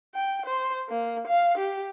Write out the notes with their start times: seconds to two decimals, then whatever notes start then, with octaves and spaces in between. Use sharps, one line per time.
0.15 G5
0.46 C5
0.89 A#3
1.27 F5
1.58 G4